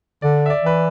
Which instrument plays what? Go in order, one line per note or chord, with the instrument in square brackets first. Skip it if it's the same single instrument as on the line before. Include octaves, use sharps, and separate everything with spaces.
[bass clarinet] D3 [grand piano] D5
[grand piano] E5
D5
[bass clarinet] E3 [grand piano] B4